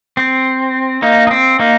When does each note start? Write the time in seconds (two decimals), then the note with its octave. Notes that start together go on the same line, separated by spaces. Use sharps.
0.17 C4
1.02 A#3 D#4
1.27 D#4
1.31 C4
1.59 A#3 D#4